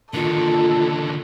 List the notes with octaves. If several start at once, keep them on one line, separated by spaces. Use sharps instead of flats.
A#2 D3 D#3 F4 A4